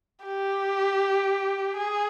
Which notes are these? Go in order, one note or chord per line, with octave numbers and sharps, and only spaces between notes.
G4
G#4